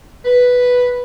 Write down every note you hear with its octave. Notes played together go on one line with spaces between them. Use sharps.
B4